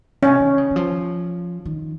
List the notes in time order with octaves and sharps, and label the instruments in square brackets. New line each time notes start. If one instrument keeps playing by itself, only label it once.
[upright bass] C3 [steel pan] C#4
[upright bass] D#3
C#3
D#3
F3
D#3